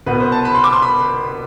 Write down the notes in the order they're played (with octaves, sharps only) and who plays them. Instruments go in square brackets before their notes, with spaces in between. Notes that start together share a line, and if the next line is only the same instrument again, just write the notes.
[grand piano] C2 B2 B3 B4
C5
A5
B5
C6
D6
C6
B5